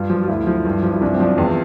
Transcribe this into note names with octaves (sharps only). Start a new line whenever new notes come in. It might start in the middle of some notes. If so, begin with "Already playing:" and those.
Already playing: G2 F4
F3
F4
D2 E4
F3
G2
F3
E4
C2 D4
C4
F3 D4
E2 C4